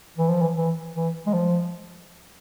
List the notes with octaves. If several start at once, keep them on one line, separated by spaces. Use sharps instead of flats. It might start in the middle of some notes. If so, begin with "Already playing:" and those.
E3
F3
E3
E3
E3
G#3
F3